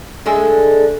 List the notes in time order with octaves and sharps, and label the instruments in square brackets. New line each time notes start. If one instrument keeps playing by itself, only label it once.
[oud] D3 G#3 E5